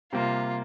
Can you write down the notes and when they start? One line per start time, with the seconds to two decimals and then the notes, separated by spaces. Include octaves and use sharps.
0.13 C3 G3 A#3 F4